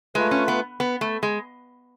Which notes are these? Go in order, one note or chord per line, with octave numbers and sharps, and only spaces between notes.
G#3 A3 F4 B4
C#4
B3
B3
A3
G#3